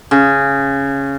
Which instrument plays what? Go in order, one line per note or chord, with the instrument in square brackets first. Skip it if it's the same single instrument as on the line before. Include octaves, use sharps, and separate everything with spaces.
[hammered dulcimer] C#3